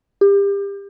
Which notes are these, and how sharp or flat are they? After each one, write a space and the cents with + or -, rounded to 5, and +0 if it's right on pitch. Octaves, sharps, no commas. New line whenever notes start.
G4 +30